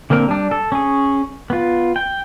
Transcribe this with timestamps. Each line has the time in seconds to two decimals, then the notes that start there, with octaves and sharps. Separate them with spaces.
0.10 D3 A#3 C4 A#4
0.28 G3 D4
0.51 A4
0.72 C#4 G#4
1.50 B3 F4
1.96 G5